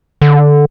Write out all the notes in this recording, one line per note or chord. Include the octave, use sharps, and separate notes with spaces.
D3